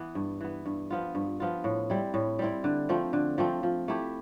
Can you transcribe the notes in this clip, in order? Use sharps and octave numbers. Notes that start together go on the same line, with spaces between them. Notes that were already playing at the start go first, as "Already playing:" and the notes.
Already playing: E3 B3
G2
E3 B3
G2
F3 B3 F4
G2
F3 B3 F4
A2
G3 C4 E4
A2
G3 C4 E4
D3
F3 A3 C4
D3
F3 A3 C4
F3
A3 E4 G4